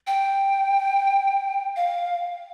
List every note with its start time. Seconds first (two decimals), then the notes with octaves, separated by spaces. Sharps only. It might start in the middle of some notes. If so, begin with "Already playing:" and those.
0.07 G5
1.76 F5